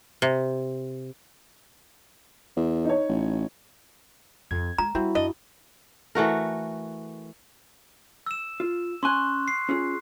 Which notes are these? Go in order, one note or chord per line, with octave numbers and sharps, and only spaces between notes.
C3
E2
D#4 C#5
A1
F2 G#6
G#3 A#5
G3 C4 E4 F#4
F#2 D4 D#5
E3 A3 F#4 A#4
E6 E7
F4
C#4 G#5 C6 C#6 F#6
C7
C#4 F4 G#4